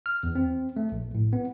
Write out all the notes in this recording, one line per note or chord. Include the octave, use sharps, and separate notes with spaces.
F6
E2
C4
A3
A#1
A2
B3